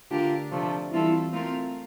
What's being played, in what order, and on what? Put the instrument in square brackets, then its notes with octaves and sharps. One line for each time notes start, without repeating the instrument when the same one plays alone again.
[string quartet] D3 A3 D4 G4 A#4 [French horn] F4
[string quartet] C3 F3 A3 D4
[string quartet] E3 G3 C4 F4 A4 [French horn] E4
[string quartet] A3 C4 F4 A#4